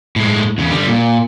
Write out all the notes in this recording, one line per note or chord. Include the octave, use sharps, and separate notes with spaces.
A2 G#3
E2 C#3
D3 G3
A#2